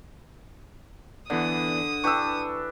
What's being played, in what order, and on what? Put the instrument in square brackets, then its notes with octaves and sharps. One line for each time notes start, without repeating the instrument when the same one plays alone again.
[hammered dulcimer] D3 [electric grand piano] E3 B3 D5 [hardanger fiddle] D#6
[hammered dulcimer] E3 D4 G4 [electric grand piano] C#6 E6